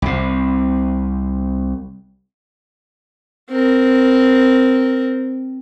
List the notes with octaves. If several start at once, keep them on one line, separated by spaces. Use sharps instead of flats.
C2 C3
C4 A#4